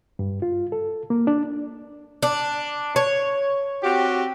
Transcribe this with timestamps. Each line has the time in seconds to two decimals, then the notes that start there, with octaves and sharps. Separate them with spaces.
0.19 G2
0.42 F4
0.72 A4
1.10 A#3
1.27 D4
2.23 D4
2.96 C#5
3.83 C4 F#4 G4